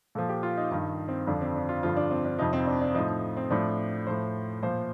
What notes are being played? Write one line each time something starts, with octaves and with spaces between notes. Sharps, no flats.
A#2 F3 A4
G4
F4
D#4
G2 D#3 D#4
C4
F2 D3 F3 D4
C4
D4
F4
G2 D3 F3 F4
D4
C4
D4
F2 C3 F3 D#4
C4
D4
D4
A2 F3 D#4
D#4
C4
A2 F3 D4
A2 F3 C5
A#2 F3 C5